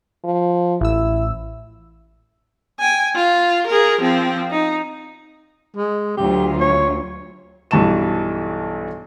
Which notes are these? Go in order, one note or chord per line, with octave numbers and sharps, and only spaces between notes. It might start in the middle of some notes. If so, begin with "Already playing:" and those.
F3
A1 E4 E6
G5 G#5
F4
G#4 A#4
F3 C4
D#4
G#3
D2 F#3 F4 G4
C#5
B1 G2 E3 A5 C#6 E7